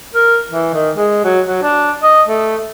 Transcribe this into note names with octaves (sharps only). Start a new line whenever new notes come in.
A#4
E3
D#3
G#3
F#3
F#3
D4
D#5
A3